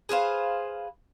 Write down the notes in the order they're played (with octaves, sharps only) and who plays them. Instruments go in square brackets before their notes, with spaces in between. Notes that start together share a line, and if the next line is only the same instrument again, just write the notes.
[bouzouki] G#4 B4 C5 F5